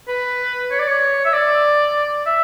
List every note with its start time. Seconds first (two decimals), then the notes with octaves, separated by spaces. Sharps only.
0.08 B4
0.71 C#5
0.79 D5
0.87 C#5
1.25 E5
1.33 D5
2.26 E5